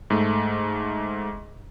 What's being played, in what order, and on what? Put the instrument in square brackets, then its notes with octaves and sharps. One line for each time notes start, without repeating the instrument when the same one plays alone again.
[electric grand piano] G#2 A3